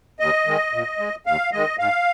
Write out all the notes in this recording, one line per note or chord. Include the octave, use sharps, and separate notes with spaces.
D#2 D#5
D#3 G#3
A#2
G#3
D#2 F5
D#3 G#3 D#5
G#2 F5